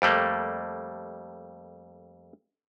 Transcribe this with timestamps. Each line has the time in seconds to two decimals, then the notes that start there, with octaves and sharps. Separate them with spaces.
0.02 F2 G3 A3 A#3